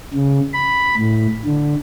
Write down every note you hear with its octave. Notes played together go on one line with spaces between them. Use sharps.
C#3
B5
A2
D3